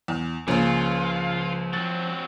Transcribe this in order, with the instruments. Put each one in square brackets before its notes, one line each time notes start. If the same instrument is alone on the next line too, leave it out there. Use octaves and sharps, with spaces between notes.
[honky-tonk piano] E2
[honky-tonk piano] C#2 [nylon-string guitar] C#3 A#3 C#4 [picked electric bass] F3 [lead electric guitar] F4
[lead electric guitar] F#3 C4 [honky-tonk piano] A6